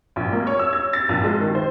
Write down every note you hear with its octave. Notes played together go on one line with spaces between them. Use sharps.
A#1
A#3
C#5
E6
G#6
A6
A#1
G#3
D#3
C5